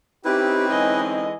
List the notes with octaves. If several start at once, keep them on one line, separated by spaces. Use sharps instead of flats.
C4 C#4 D#4 E4 G4 B4
D3 E3 G#3 D#5 G#5